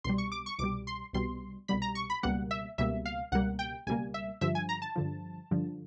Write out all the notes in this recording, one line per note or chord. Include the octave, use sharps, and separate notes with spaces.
C2 B2 G3 C6
C#6
D6
C#6
C2 B2 G3 D6
C6
C2 B2 G3 C6
C2 B2 G3 B5
A#5
C#6
B5
C#2 B2 G3 A#3 F#5
E5
C#2 B2 G3 A#3 E5
F5
C#2 B2 G3 A#3 F#5
G5
C#2 B2 G3 A#3 G#5
E5
G2 D3 F3 E5
G#5
A#5
A5
G2 D3 F3
G2 D3 F3